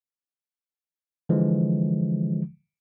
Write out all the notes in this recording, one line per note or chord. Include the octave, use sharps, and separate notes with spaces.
D3 E3 F3 G#3